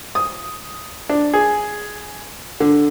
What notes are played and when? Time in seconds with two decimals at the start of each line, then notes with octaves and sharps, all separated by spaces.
0.15 D#6
1.09 D4
1.34 G#4
2.60 D3